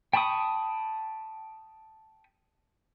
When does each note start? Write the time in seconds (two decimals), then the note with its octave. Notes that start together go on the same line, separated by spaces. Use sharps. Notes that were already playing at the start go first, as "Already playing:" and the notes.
0.13 G5 A5 B5 C#6 D#6